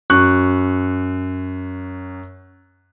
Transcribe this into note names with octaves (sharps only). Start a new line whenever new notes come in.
F#2 C#6 F#6